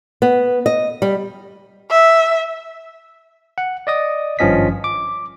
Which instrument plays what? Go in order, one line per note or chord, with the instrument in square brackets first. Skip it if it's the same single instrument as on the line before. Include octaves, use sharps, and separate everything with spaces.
[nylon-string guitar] B3
D#5
G3
[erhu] E5
[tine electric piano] F#5
D5 D#5 D#6
G#1 G2 F3 C#4 D#5 B6
D6